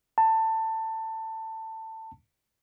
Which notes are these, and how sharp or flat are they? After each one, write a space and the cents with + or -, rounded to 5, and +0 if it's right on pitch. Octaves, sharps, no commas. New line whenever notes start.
A5 +20